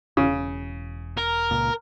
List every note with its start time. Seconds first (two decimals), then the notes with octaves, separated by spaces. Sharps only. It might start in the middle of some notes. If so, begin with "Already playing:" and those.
0.17 E1 C#3
1.17 A#4
1.51 C#2 A#2